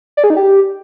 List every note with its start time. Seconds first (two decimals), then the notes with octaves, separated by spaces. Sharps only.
0.17 D5
0.24 G#4
0.30 D#4
0.37 G4